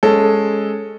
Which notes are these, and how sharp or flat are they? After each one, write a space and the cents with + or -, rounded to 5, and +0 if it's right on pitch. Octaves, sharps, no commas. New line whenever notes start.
G#3 +0 C#4 +0 A4 +0